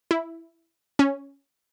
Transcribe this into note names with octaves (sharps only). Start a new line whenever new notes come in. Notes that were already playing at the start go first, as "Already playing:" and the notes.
E4
C#4